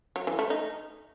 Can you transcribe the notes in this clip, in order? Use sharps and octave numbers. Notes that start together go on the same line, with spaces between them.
F#3
E3
A3
D#4